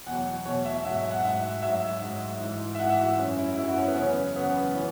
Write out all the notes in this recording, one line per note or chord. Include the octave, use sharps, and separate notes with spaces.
E2 B2 F#3 F#5
E2 B2 F#3 C#5
E5
G#2 F#3 E5
E5
F#5
G#2 F#3 E5
G#2 F#3 E5
G#2 F#3
G#2 E3
E5
G#2 E3 F#5
E5
F#4
F#2 F#3 C#4
E4
F#2 F#3 E4
F#4
C#4
B3
E2 C#3 F#3 C#4
E2 C#3 F#3 B3
E3 C#4